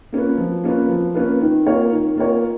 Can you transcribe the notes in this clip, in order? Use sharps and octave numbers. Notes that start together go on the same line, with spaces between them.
A#3 C#4 F4 B4
F3
A#3 C#4 F4 B4
F3
A#3 C#4 F4 B4
D#3
A#3 F4 A#4 C#5
D#3
A#3 F4 A#4 C#5